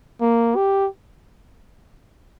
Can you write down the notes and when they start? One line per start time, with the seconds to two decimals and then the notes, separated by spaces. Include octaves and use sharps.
0.21 A#3
0.56 G4